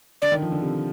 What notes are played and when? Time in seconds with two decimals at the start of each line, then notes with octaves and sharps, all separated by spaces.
0.22 D3 D5
0.32 D#3
0.42 F3
0.52 D3
0.62 C3